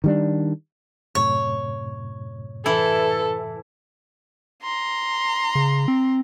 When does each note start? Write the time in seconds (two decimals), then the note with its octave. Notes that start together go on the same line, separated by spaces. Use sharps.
0.04 D#3 G3 D4
1.15 F#2 A2 C3 C#5
2.66 E3 E4 A4
4.62 A#5 C6
5.55 C#3
5.88 C4